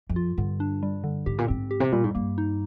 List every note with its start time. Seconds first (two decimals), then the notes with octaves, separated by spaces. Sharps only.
0.09 F2
0.16 F4
0.38 G2 D3
0.60 D4
0.83 G3
1.04 D3
1.26 G#2 G4
1.38 A#2
1.48 G#2 C4
1.71 G4
1.80 C3
1.92 A#2 G3
2.04 G#2
2.15 G2 A#3
2.38 D#4